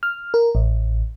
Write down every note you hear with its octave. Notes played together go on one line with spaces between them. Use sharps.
F6
A#4
A1